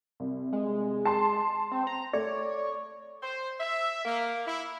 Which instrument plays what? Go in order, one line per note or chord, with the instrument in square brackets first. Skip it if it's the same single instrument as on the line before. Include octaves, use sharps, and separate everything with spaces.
[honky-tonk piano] C2
[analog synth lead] G#3
[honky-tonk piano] A5 C6
[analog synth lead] C4
A#5
[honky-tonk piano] A3 D5 [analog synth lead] C#5
[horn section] C5
E5
A#3
E4